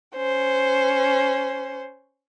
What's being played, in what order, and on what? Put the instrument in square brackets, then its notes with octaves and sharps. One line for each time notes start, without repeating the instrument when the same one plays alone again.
[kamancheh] C#4 C5